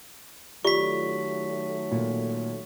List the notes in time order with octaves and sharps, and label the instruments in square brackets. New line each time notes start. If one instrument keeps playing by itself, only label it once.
[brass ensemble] D#3 F#3 A3 [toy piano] F4 G4 [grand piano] D5 [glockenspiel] C#6 B6
[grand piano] A#2